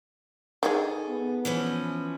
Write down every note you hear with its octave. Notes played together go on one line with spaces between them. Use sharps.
D#3 G3 G#3 G#4 A4
B3
E3 F3 C#4